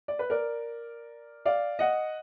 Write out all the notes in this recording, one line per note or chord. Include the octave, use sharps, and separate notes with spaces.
D5
B4
A#4 D5
D5 F5
D#5 F#5